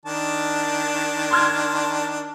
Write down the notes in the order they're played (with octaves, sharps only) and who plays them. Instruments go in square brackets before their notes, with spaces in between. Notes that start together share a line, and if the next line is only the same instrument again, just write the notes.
[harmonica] D#3 D4 A5
[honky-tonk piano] C6 F6 G#6